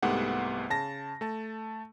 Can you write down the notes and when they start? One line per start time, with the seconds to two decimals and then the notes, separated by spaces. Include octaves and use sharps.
0.02 C2 G#2 A3 B3 G4 F#5
0.70 C#3 A5 A#6
1.21 A3 A5